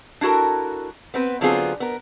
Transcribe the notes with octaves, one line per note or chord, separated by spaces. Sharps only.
D4 E4 F#4 A4 A#4
B3 C4 B4
D3 F#3 B3 C4 F4 G#4
B3 A#4